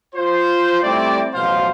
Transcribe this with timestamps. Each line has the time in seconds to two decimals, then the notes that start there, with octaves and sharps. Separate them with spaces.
0.15 F4 C5
0.83 G3 A3 C4 E4 G4 D5
1.34 A1 B2 F3 F#3 C5 F5